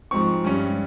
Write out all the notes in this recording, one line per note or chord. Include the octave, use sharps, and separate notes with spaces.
G#2 F3 G#3 C4 C#6
G2 G3 C#4